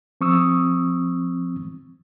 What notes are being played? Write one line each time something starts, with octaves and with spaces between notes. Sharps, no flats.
F3 C4 C#6 D#6 E6